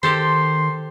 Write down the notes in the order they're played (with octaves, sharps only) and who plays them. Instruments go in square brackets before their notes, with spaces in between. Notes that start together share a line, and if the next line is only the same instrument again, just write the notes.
[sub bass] D#3 [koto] G4 A4 C5 [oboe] C6